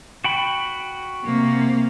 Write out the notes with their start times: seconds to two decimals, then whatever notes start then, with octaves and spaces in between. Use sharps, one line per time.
0.24 F#4 G5 B5
1.25 C3 A#3